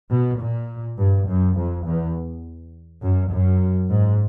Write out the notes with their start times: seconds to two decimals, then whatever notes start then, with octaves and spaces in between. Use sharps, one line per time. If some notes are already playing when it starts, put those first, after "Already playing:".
0.11 B2
0.39 A#2
0.98 G2
1.28 F#2
1.57 F2
1.86 E2
3.02 F#2
3.32 F#2
3.90 G#2